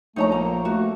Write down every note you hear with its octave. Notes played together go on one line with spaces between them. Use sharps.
A#1 A3 D#4 C#5 A#5
A#3 A#5
A3 F#4